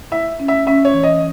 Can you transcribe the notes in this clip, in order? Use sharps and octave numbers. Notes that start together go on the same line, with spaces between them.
E4 E5
C#4
E5
C#4 E5
C#5
E3
D#5